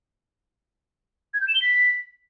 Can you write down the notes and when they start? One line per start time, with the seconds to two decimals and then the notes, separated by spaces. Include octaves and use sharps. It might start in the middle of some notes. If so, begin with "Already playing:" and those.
1.34 G#6
1.41 G6
1.48 E7
1.55 G7
1.62 B6